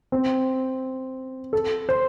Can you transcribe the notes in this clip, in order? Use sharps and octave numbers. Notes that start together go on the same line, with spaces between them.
C4
A4
C5